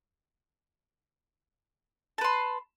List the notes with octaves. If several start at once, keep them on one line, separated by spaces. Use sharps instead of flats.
B4 A5 C6